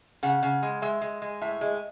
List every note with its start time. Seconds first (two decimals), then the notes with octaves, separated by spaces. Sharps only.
0.23 C#3 F#5
0.43 C#3
0.63 G#3
0.82 G#3 E5
1.02 G#3
1.22 G#3
1.41 A2 E5
1.61 G#3